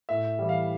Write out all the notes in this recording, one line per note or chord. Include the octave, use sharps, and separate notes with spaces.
A2 E5
E3 G3
F5